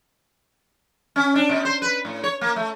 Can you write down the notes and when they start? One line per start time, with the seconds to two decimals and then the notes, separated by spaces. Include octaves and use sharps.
1.16 C#4
1.35 D4
1.49 B2
1.65 C5
1.82 B4
2.05 A2
2.24 C#5
2.41 A#3
2.56 A3